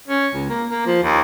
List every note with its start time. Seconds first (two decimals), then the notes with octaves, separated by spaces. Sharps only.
0.07 C#4
0.34 C#2
0.49 A#3
0.70 A#3
0.86 F3
1.03 D#2